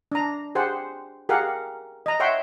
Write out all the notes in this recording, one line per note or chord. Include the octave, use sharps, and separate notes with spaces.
D4 A#5
G4 G#4 C5 F#5
G4 G#4 A#4 F5 F#5
D#5 A#5
C#5 E5 F#5 G5 C6